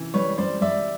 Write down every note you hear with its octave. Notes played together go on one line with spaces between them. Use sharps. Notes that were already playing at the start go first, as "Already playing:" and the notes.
Already playing: C3 E3
G3 B4 C#5
G3 C5 D5
G3 D5 E5